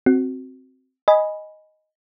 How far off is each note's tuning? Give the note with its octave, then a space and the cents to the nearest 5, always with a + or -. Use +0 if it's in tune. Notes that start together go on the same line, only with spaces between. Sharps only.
C4 +0 F#4 +0
D#5 +0 G#5 +0 B5 +0